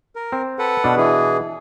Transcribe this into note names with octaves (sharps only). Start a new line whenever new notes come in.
A#4
C4
A4 B4 F#5
B2 D4
E3 G#4